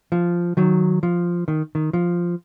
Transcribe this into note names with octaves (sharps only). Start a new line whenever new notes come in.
F3
D#3 F#3
F3
D#3
D#3
F3